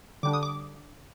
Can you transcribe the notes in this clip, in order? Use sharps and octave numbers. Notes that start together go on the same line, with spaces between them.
D3 G3 D4 D6
D#6
D6